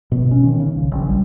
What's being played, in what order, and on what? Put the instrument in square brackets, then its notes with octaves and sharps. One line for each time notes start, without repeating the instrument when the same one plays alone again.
[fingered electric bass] B2
C#4
D#3
C#3
C2
A#1
G3